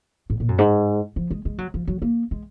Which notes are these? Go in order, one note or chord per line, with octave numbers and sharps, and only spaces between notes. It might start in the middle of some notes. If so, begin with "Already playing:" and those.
G#2
A#2
F#2
G#2
F3
G#3
G#3
F#3
F3
F#3
A#3
G#3